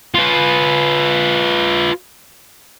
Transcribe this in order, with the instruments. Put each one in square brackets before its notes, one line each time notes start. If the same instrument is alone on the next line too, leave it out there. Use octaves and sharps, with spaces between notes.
[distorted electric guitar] F4 B4